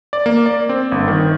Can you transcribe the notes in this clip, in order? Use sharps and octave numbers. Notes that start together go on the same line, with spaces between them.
D5
A#3
D5
C4
G1
D#3